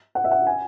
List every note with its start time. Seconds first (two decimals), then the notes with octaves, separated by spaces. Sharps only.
0.15 F#5
0.24 E5
0.31 F#5
0.47 G#5